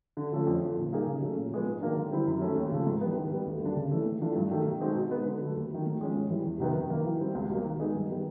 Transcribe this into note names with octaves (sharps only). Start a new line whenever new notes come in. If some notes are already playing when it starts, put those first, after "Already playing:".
D3
F3 A3 C#4 F4
F2
D3 F3
A#2
G3 A#3 D#4 G#4
C#3
F#3 A3 C#4
A#2
F3 G#3 B3
G#2
D#3 F#3 A#3 D4
D3
G3 C4 E4
F#2
D#3 F#3 A3 C#4
D#2
C#3 F3 A3
G#2
E3 G3 B3
D#3
G3 B3
D2
D3 G3 A#3 D4
C#3
E3 A3
A2
E3 A3 D4 F4
G2
D#3 F#3 A3
B2
G#3 C4 D#4 F#4
B2
G#3 B3 D#4
D3
F#3 A3
D#2
D#3 F#3
A2
F3 G#3 C#4
G#2
E3 G3
E2
C3 D#3 F#3 B3
F#2
D#3 F#3 A#3
E3
G3 C4
C#2
B2 G3 A#3
D#3
G#3 B3 D#4 G#4
G2
D#3 G3 B3